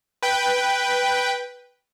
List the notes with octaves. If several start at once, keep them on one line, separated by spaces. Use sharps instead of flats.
B4 G5